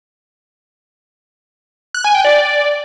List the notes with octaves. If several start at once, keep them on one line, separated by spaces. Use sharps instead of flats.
F#6
G#5
G5
D5